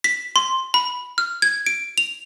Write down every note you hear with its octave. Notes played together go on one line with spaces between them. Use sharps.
B6
C6
B5
F6
G#6
D7
F7